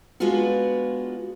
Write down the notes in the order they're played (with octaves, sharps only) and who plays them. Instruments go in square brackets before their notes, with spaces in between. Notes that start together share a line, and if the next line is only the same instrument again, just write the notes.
[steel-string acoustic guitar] G#3 B3 D4 F4 F#4